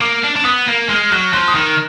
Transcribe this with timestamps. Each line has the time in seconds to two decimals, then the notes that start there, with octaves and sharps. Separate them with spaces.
0.01 A#3 D6
0.24 D4
0.36 D4
0.45 B3 D#6
0.67 A#3
0.89 G#3 F6
1.11 F#3 F#6
1.33 F3 F#6
1.48 D#6
1.55 D#3 F6